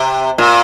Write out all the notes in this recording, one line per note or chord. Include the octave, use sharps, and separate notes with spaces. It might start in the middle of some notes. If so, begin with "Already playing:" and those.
Already playing: C3
A#2